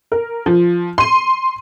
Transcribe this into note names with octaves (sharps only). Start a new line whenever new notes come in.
A#4
F3
C6 D#7